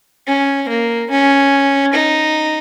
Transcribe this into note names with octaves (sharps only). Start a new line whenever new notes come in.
C#4
A#3
C#4
D#4